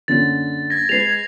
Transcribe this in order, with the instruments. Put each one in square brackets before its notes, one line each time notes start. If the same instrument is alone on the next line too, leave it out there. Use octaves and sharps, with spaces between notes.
[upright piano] F#2 D3 A#3 [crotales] A6
[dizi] G#6 [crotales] A#6
[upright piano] G#3 B4 [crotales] C7 F7